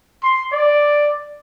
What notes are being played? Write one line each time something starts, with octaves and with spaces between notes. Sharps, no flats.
C6
D5